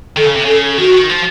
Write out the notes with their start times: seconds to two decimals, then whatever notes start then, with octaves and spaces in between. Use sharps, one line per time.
0.17 D#3 A4
0.26 C#3
0.36 C3
0.46 C#3 A4
0.71 A4
0.78 D#3 F#4
0.93 D#3
1.10 F3